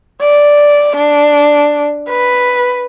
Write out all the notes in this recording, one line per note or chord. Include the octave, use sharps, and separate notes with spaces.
D5
D4
B4